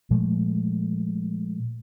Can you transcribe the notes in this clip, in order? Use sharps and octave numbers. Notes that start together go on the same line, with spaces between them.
A#2 F3 G#3 A3